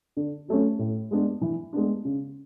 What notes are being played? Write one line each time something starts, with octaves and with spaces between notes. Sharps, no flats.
D3
F#3 A3 C#4
A2
G#3 B3 D4
E3
G#3 B3 D4
C#3